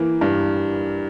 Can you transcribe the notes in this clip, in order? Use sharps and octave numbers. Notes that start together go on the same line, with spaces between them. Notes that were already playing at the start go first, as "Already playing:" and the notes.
Already playing: E3 A#3
G2